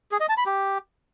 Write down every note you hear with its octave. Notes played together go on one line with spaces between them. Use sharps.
G#4
D#5
A5
B5
G4